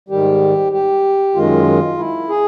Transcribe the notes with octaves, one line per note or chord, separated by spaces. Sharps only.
G#2 D#3 G3 G4
G4
F#2 D#3 G#3 F4
E4
G#4